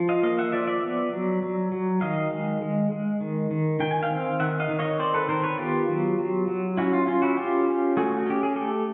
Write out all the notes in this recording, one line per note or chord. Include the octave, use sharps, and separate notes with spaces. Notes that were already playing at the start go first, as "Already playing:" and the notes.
Already playing: F3
D#5 F5
A#3 D#5 F5
E5 F#5
F3 D5 E5
D5 E5
B3
F#3
F#3
F#3
D#3 D#5 F5
G#3
G#3
G#3
D#3
D#3
D#3 G5
G#5
F5 G5
C4
D#3 E5 F#5
D#5 F5
D#3
C#5 D#5
C4 C5 D5
A4 B4
D#3 A#4 C5
B4 C#5
B3 F4 G4
F#3
F#3
F#3
C#4 E4 F#4
F4
C#4 F4
E4 F#4
C#4 F4 G4
C#4
A3 F#4 G#4
F#4
C#4 G4
G#4
A3 G4 A4